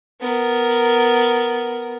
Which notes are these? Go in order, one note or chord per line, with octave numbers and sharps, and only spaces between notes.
B3 A#4